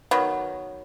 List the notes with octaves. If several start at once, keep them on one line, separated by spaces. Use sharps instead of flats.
D#3 F#3 B3